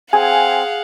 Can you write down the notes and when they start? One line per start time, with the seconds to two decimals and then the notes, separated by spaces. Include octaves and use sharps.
0.13 C4 G#4 F5 F#5 G#5